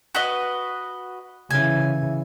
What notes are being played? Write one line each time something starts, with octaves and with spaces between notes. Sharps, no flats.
F#4 B4 D#5
C#3 E3 G#5